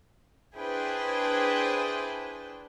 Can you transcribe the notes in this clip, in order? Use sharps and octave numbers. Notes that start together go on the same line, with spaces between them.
D4 E4 G#4 B4 C5 G5